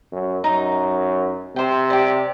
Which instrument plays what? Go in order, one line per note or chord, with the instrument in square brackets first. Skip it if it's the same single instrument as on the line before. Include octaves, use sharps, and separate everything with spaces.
[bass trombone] F#2
[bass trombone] F#2 [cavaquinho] D#4
[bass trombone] C3 [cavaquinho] C5 G5
[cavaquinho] G4 D5